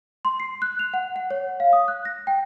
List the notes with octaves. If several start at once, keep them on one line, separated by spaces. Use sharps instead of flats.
C6
C7
F#6
F7
F#5
F#5
C#5
F5
D#6
F#6
A#6
G5